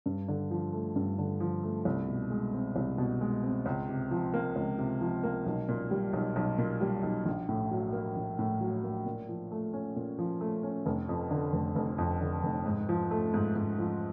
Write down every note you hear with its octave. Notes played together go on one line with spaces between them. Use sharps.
G2
D3
F3
A3
G2
D3
F3
A3
C2
B2
G#3
C4
C2
B2
G#3
C4
C#2
C3
F3
A#3
C#2
C3
F3
A#3
B1
A#2
G3
B1
B1
A#2
G3
B1
A#1
A2
F#3
A#3
A#1
A2
F#3
A#3
A#2
F3
A3
C#4
A#2
F3
A3
C#4
F1
F2
D3
F1
F1
F2
D3
F1
G#2
F3
A3
G#2
G#2
F3